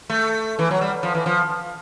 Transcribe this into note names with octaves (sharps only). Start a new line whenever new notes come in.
A3
E3
F#3
G3
F3
E3
F3